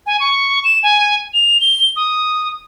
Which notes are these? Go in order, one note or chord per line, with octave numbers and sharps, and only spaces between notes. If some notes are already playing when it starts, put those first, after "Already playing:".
G#5
C#6
E7
G#5
F7
G7
D#6